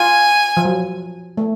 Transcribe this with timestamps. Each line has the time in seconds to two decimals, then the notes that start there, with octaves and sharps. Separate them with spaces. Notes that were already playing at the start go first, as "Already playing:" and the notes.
Already playing: F4 G#5
0.57 F3
0.65 F#3
1.37 A3